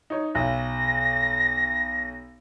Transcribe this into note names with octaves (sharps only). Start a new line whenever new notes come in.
D#4 C#5
B1 A#6